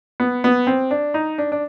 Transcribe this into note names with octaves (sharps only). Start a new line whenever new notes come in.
B3
B3
C4
D4
D#4
D4
D4